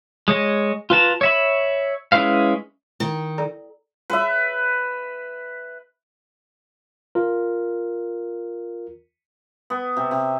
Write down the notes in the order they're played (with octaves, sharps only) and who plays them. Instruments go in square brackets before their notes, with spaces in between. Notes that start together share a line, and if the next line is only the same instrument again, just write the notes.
[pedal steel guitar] G#3 C#5 D#5
F4 B4 A5 A#5
C#5 E5 B5
G#3 C#4 E4 B4 F5
[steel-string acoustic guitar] D#3
[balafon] A4 D5 A#5
[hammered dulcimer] B4 E5
[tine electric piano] F4 A#4
[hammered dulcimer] B3
C3
C3